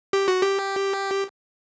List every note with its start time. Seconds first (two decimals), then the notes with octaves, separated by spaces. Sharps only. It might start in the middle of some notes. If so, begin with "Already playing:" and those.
0.13 G4
0.28 F#4
0.41 G4